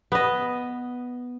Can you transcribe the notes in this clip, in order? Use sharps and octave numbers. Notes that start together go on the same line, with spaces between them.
B3 D#5